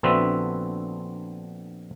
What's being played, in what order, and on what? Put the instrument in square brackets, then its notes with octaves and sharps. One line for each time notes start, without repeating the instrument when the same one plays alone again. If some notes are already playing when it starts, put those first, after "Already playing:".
[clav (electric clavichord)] A#1 D3 B3 C4 F#4 E5